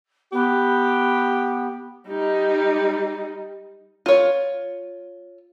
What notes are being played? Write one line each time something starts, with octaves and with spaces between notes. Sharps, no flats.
B3 G4
G3 D#4
F4 C#5